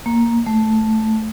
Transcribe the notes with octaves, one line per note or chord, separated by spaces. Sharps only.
A#3
A3